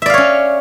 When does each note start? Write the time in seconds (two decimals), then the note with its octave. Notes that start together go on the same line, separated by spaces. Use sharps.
0.02 E5
0.06 D5
0.10 F5
0.14 C#5
0.18 C#4